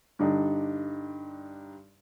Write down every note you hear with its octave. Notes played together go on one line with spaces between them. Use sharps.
G2 D3 D4 D#4